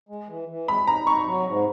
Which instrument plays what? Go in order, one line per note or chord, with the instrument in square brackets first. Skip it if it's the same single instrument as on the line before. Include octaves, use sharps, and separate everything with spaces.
[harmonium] G#3
E3
E3
[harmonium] G#3 [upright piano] B5
[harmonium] D#4 [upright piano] A#5
[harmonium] D#4 [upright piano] C#6
[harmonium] F#3
G#2